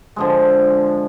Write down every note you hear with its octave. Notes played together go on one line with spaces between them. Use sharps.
D3 F3 G#3